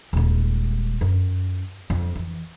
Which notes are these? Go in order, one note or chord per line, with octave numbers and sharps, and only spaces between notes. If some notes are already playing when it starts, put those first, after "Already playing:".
D#1 G#3
F#2
F2
E3